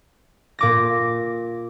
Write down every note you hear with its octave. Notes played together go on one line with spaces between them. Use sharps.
A#2 D6 A#6